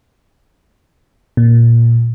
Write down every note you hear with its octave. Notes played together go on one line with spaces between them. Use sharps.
A#2